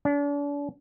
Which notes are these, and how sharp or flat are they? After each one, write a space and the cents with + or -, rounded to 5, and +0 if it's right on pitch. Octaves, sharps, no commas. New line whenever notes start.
D4 -40